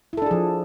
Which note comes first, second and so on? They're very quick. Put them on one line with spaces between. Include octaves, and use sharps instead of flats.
E4 A4 D4 G#4 F3